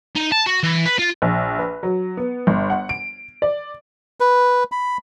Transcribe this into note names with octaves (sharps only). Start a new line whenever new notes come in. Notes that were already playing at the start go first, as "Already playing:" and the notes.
D#4
A5
F#4
E3
B4
F4
A#1
B4
F#3
B3
G1
F#5
D7
D5
B4
B5